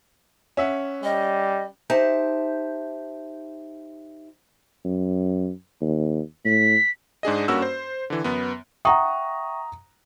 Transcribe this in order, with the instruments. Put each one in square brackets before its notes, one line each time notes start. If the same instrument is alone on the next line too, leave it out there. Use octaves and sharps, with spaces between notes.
[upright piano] C#4 E5 F#5
[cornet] G3 [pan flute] D#5
[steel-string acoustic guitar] D#4 G4 C5 E5 A5
[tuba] F#2
D#2
[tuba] A2 [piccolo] B6
[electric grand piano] G#2 D4 G#4 D#5
G2 A#3 C#4 F#4 E6
C5
D3 E3
F#2 B3
[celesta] E5 G5 C#6 [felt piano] F#5 A#5 D#6